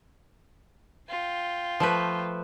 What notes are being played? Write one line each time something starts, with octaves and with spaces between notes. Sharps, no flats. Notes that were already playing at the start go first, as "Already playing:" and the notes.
F4 G5
F3 A3 B4